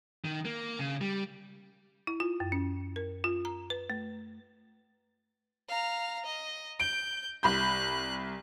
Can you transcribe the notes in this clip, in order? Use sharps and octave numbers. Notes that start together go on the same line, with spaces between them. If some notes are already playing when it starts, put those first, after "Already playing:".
D#3
A#3
C#3
G3
E4
F4
F#2
C#4
A#4
F4
A#5
B4
A3
F5 A#5
D#5
G6 D7
C2 B5 F#6 G6